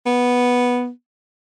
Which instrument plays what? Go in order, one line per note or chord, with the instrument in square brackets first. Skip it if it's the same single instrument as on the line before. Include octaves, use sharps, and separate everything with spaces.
[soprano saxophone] B3